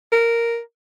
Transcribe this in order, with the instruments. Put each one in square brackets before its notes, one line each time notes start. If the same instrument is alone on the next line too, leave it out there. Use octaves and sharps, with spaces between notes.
[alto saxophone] A#4